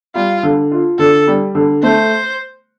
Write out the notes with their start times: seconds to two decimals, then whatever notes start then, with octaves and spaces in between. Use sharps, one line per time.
0.15 G3 F4
0.43 D3
0.71 F4
0.99 D3 A4
1.27 G3
1.55 D3
1.83 A3 C5